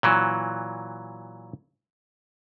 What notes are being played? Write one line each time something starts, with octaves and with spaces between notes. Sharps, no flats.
A#2 E3 F#3